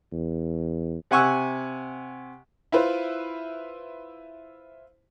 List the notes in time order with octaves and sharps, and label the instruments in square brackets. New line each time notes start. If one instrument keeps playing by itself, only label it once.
[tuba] E2
[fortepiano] C3 F#5 G#5 C#6 E6 F#6
[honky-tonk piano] E4 F4 B4 C5